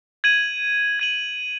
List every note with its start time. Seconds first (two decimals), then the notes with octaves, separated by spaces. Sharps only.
0.24 G#6 D#7 F#7
0.99 G#6 D#7 F#7